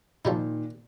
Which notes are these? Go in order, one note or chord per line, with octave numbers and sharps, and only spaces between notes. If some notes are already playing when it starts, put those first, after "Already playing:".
A#2 D#3 F3 G3 D#4